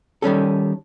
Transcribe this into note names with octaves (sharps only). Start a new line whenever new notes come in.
D#3 G3 C#4 A4